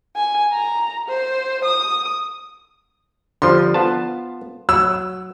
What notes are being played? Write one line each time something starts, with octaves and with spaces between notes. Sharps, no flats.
G#5
A#5
C5
D#6
D3 F3 G3 C6
B3 F4 A5
F#3 E6